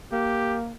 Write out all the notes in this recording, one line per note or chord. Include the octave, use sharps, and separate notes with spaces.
A#3 G4